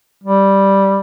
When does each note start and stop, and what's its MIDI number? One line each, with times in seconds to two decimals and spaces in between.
0.24 0.99 55